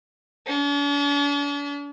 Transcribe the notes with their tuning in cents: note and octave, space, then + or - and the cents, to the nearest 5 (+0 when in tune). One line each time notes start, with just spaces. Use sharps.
D4 -45